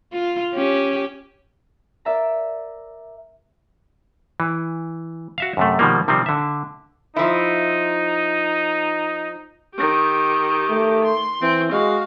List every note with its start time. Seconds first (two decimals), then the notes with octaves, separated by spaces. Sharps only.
0.13 F4
0.54 C#4 G4
2.05 A#4 D5 E5 A#5
4.40 E3
5.38 F#4 E5 F5
5.57 F#2 C3 A3
5.79 B2 D#3 F3 G3 A#3
6.08 C3 D#3 F3 G3 C4
6.26 D3 E5
7.16 F3 D#4 E4
9.75 D#3 G4
10.69 A3
11.04 C6
11.42 E3 C4
11.71 G#3 F#4 F5